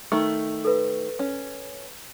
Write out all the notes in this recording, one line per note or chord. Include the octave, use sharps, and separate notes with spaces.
D#3 A3
A4 B4
C#4